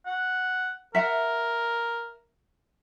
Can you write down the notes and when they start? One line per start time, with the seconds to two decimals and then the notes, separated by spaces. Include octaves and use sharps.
0.06 F#5
0.95 A#4 E5 F#5